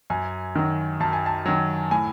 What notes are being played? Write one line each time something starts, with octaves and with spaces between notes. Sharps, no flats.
F#2 G#5
D#3 F#3
F#2 A5
G#5
A5
D#3 F#3
A2 G#5